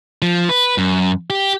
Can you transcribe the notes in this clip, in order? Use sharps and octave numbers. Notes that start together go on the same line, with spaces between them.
F3
B4
F#2
G4